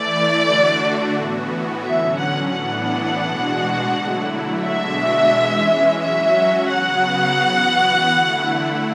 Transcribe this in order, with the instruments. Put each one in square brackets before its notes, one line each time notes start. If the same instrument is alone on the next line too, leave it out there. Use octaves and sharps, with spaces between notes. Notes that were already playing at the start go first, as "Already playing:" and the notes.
Already playing: [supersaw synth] E3 A3 E4 [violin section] D5
[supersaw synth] D3 A3 D4 F#4
A2 E3 B3 F#4
[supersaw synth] D3 F#3 C#4 [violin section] E5
[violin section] F#5
[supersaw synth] A2 E3 B3 D4 [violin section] F#5
[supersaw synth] B2 G#3 D4 F#4
D3 F#3 A3 E4
[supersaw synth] B2 G#3 D4 F#4 [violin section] E5
[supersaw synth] E3 G#3 C#4
[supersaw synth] F#3 C#4 F#4 [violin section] E5
[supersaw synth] C#3 F#3 B3 F#4 [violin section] F#5
[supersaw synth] E3 B3 F#4
D3 A3 E4